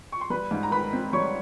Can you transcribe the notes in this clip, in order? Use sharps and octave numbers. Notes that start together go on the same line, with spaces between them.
C#6
C6
G3 B4 B5
G#2
A#5
D#3 B4 B5
C4
G3 C#5 C#6